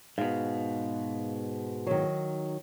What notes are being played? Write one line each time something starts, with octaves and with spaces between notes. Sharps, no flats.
G#2 B2 F5
D#3 F#3